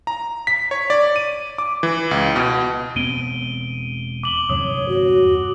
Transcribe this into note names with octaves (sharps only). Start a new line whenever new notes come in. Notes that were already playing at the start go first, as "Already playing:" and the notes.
A#5
B6
C#5
D5
D#7
D6
E3
C#2
B2
E1 B3 C4 D7 D#7 G7
D6 F#7 G7
E2 G2 C3 C#5 D#6
F#4